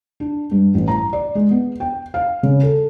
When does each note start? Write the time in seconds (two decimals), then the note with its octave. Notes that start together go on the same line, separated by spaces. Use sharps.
0.20 D4
0.51 G2
0.75 A1
0.88 A#5
1.13 D5
1.35 G#3
1.51 B3
1.80 G5
2.14 F5
2.43 C#3
2.63 A4